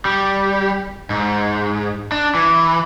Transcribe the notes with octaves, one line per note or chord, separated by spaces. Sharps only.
G3
G#2
D4
E3